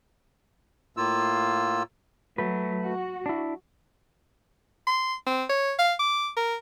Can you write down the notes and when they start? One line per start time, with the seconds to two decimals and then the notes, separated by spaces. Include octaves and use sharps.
0.97 A2 A#3 F4 E6
2.38 F#3 A3 B4
2.80 F#4
3.26 D4 E4
4.87 C6
5.26 C4
5.49 C#5
5.78 F5
5.99 D6
6.36 A#4